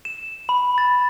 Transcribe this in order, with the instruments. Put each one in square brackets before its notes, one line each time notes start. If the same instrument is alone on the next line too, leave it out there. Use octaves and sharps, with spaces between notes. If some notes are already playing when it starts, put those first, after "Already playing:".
[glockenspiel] E7
B5
A6